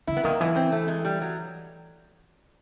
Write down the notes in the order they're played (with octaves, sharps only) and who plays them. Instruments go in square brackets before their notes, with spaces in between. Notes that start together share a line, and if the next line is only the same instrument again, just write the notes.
[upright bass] D3 [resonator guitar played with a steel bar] E4
[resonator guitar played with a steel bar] B3
[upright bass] D#3 [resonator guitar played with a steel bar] A#3
[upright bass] E3 [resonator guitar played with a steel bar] B3
[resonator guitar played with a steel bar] C4
A3
G#3
G3
F#3